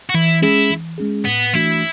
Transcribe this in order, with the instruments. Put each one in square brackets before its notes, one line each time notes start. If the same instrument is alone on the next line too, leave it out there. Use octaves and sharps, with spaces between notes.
[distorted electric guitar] F#4
[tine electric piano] E3 [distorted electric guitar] E4
[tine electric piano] G#3 C#4 G#4 [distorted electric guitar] E4
[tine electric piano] E3
G#3 C#4 G#4
[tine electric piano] A2 [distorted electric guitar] B3
[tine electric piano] E3 A3 D4 F#4 [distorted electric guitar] E4